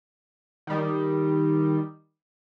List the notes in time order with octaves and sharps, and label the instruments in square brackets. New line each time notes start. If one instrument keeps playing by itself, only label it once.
[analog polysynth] D#3 G3